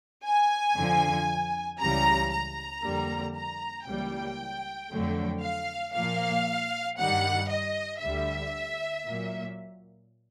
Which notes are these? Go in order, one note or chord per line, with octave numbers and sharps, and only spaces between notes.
G#5
F2 D3 F3
C#2 C#3 E3 G3 A#5
A#5
F2 D3 G3 A#3
A#5
C#2 C#3 E3 G3 A#3 G5
F2 D3 F#3 A3
F5
A#2 F3 A#3 F5
G2 D#3 G3 F#5
D#5
D2 D3 G3 E5
A#2 F#3 A#3